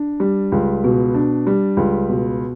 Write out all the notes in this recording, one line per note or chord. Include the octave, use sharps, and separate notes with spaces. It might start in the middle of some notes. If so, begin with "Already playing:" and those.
Already playing: D4
G3
C#2
B2
D4
G3
C#2
B2